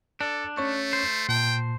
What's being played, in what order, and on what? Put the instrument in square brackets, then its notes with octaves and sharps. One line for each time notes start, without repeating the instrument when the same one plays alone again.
[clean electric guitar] D4 [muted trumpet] A4 [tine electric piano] D5
[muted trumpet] A3 [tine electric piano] C#4 C#5 C#6
[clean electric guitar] C5
[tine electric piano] A#2 A5 [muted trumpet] G5